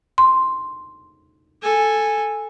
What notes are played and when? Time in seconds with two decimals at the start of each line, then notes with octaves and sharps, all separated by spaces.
0.18 C6
1.62 A4 G#5